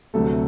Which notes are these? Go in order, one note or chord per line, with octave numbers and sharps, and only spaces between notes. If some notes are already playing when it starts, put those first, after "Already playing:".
D2 C3 F#3 A3 A4